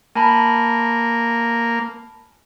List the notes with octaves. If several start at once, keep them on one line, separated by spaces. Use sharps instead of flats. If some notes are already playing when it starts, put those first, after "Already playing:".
A#3 G#5 A5 B5